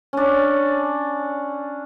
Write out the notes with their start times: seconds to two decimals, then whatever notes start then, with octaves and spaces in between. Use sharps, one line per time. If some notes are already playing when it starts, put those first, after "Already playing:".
0.13 C#4 D4